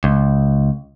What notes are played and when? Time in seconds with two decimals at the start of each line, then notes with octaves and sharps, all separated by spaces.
0.04 C#2